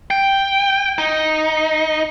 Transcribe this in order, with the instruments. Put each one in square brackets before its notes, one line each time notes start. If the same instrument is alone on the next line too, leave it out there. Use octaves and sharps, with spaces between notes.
[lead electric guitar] G5
D#4